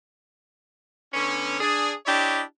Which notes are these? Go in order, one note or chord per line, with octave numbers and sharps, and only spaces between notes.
D3 B3 C#4
D4 G#4
D4 E4 G4 C#5 D#5